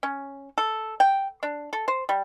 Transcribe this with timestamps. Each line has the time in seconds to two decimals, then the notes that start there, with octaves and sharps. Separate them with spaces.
0.03 C#4
0.58 A4
1.00 G5
1.43 D4
1.73 A4
1.88 C5
2.09 G3